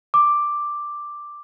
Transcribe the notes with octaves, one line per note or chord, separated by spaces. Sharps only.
D6